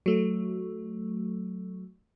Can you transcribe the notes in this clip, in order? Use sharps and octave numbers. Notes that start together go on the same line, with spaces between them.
F#3 A3